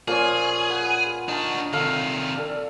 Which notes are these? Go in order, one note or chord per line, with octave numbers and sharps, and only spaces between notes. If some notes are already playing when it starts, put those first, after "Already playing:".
A#2 F3 C#4 G#4
B4 F#5
D4 D#4 F#4 A5
C3 D#3 A4 F5 B5
A4 D5